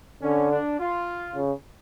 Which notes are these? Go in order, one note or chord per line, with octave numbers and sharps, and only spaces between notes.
D3 C#4
D4
F4
C#3